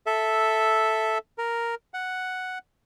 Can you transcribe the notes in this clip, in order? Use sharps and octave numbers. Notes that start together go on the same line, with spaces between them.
A4 E5
A#4
F#5